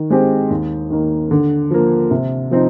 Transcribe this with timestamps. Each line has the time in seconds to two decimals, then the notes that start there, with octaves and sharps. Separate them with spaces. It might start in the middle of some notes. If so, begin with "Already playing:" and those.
Already playing: D#3
0.10 G#3 C4 G4 C5
0.50 D#2
0.90 D#3 A#3
1.31 D3
1.71 F3 A#3
2.11 C3
2.51 F3 C4 D#4